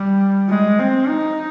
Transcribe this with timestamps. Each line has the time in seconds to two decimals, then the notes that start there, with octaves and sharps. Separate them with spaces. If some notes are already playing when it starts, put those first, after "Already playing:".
Already playing: G3
0.49 G#3
0.80 C4
1.09 D#4